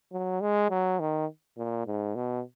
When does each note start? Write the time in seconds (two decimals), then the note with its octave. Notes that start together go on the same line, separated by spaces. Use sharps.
0.13 F#3
0.41 G#3
0.70 F#3
1.00 D#3
1.58 A#2
1.86 G#2
2.15 B2